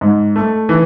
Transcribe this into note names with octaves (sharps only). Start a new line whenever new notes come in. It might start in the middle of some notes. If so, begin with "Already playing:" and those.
G#2
A3
E3